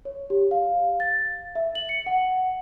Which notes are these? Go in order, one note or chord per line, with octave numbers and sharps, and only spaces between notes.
C#5
G4
F5
A6
E5
F#7
C#7
F#5